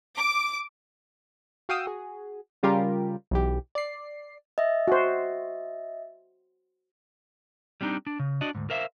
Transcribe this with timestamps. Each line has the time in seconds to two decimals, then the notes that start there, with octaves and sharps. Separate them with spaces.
0.17 D6
1.69 F#4 F5 G5 D#6 E6
1.86 F#4 G#4
2.63 C#3 G3 F4 G4 A#4
3.31 B1 E3 G4
3.75 D5 C7
4.58 D#5 E5
4.88 F#4 C5
7.81 G3 C4 D4 D#4
8.07 D4
8.19 C#3
8.41 D4 F#4 D5 D#5
8.55 D2 G#2
8.70 A#4 C5 E5 F5